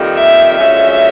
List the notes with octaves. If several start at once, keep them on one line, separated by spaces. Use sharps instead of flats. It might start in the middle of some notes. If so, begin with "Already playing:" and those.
Already playing: F2 C3 D#3 G3 A#3
E5
F#2 D3 F3 G#3 C#4 E5